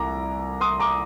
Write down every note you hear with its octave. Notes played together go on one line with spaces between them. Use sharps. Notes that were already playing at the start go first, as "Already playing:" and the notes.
Already playing: C2 A#5 D6
C6 D#6
A#5 D6